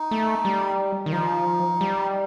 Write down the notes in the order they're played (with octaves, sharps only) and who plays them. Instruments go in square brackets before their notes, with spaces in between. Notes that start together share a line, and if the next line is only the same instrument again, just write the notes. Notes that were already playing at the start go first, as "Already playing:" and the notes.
Already playing: [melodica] D#4
[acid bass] A3
G3
D#3
[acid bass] F3 [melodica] D#4
[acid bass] G3